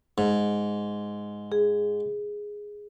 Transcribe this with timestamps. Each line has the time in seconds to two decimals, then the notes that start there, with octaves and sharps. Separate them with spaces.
0.18 G#2
1.52 G#4